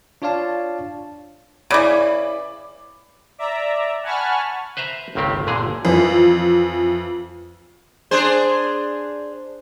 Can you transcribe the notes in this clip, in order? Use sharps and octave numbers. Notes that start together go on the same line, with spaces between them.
D4 F4 C#5 D5 F5 A5
C#3 E3 D5 B5 D6
D5 E5 A#5
F#5 G#5 A5 B5 C#6 F6
B4 C5 E5 A#5
G1 C#2 D#3 C4 G4
G1 A#2 D3 G#4
F2 E3
D4 G#4 C5